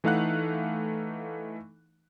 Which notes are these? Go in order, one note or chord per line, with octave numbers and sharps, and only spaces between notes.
E3 A3 D#4 F5 F#5 F#6